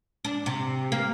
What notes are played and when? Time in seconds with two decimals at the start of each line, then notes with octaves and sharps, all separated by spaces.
0.25 D4
0.46 C3
0.92 A#3